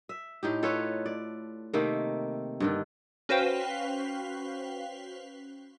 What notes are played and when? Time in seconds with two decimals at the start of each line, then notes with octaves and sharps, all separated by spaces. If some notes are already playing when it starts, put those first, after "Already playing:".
0.09 E5
0.43 A2 D#4 G4
0.63 F4 A4 B4 C#5
1.06 D5
1.74 C3 D#3 A3 A#3
2.60 G2 D3 D#3
3.29 C#4 F#4 B4 C5 F5 G5